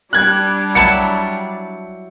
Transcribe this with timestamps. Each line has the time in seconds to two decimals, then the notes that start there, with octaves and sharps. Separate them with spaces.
0.13 G3 D4 F#6 G#6
0.75 F#3 E4 A5 C#7